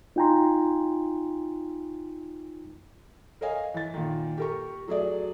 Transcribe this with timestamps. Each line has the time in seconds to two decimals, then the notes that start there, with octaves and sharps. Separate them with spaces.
0.16 D#4 F4 G5 G#5 A#5 C6
3.41 A#4 C#5 D#5 F5 G#5
3.74 E3 A6
3.94 A#2 D#3
4.38 G4 A#4 C#6
4.88 F#3 A3 G#4 D5